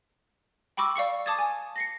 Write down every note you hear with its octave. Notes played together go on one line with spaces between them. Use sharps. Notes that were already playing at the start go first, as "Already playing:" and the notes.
G5 B5 C#6 D6 E6
D5 F5 C#6 C#7
A5 D6 D#6 G#6 A6
G#5
A#6 C7 C#7